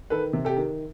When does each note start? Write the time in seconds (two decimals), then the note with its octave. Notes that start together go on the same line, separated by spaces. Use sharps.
0.10 D#3 A4 B4
0.33 C3
0.45 G4 A4
0.56 D#3